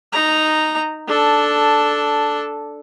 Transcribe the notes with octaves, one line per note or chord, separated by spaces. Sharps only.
D#4 A#5
D4 A4